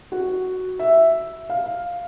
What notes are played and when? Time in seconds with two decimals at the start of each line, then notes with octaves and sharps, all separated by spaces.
0.12 F#4
0.79 E5
1.50 F5